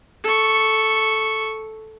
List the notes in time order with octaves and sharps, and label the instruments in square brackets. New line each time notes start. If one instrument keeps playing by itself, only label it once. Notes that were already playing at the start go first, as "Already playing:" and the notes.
[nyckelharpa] A4 C#6